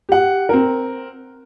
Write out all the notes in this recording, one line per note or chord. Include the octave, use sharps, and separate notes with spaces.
G4 F#5
C4 A#4